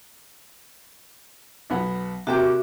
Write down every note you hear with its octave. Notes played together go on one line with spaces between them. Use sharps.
B1 B3 F#5
C3 A#3 F#4 E5 G5 D6